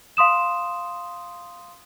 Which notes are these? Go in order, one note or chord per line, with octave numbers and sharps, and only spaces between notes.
F5 C6 D#6 E7